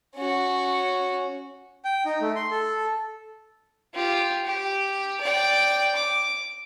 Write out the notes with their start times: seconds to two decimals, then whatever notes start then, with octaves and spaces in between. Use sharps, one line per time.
0.16 C#4 F#4
1.85 G5
2.06 D#4
2.21 A3
2.36 C6
2.51 A4
3.94 F4 G4
4.45 G4
5.21 D5 G5
5.96 D6